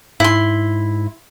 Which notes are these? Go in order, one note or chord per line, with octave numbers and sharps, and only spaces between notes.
G#2 E4 C6